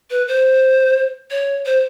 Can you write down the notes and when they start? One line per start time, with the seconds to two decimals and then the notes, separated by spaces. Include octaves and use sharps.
0.10 B4
0.28 C5
1.31 C#5
1.66 C5